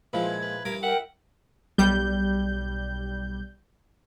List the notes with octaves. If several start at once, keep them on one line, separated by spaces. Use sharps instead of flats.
A#2 F3 G#3 E4 B4
G#6
B4
G2 A#4 B5 D6
A#4 E5 F#5 G5
B1 G3 G6